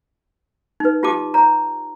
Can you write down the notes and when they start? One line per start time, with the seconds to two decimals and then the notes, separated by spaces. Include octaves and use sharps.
0.80 D#4 B4
1.03 F4 G4 D#5 A5 D6
1.34 C#5 A#5